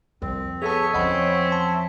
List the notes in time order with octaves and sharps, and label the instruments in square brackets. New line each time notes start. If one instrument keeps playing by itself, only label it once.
[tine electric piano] C2 [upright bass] F2 [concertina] C4
[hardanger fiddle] B3 C#6 [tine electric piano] G#4 A4 A5 [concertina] C#5 E5
[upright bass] E2 F3 [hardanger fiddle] C4 C#4 [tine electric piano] D#5 F#5 B5
[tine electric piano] A5 C6